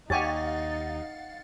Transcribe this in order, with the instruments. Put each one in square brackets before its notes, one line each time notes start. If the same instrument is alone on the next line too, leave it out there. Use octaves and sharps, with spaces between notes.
[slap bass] D#2 [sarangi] D#4 [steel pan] G4 C#5 G#5 [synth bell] F5 F#5 A6